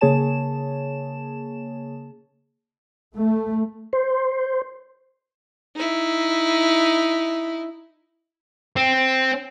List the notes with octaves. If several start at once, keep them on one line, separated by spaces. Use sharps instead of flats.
C#3 A#3 G#4 C#5 A5 E7
A3
C5
D#4 E4
C4